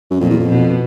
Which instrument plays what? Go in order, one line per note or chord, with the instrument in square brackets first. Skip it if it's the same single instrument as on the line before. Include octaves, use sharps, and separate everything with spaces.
[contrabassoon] F#2
[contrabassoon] F2 [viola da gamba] A#2
[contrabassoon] E2
F2
[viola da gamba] B2